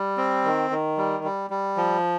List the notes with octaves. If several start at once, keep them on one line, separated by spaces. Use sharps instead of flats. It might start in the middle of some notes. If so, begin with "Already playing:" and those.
Already playing: G3
C4
D#3
D#3
G3
G3
G3
F3